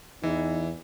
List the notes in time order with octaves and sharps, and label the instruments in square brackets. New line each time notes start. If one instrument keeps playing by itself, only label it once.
[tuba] E2 [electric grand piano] E3 [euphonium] D#4